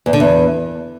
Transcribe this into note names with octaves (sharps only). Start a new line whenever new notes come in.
E2
D3
E2